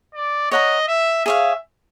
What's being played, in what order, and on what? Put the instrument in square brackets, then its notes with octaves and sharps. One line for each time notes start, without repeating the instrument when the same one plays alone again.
[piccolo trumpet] D5
[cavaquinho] C#5 F#5 A#5 [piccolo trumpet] D#5
[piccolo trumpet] E5
[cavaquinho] G#4 C#5 F5 [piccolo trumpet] E5